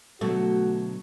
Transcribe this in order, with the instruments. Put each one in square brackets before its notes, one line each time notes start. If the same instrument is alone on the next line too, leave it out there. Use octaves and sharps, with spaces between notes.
[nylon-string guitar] B2 D3 F#3 [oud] A3 [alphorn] F#4